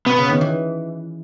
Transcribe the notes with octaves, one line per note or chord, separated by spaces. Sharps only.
B2 B3
C#3
D#3
E3